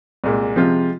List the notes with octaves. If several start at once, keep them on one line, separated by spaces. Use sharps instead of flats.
C2 A#2 G#3
C3 F3 G#3 C4 F4